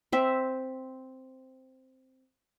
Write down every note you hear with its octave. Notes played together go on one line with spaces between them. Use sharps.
C4 E5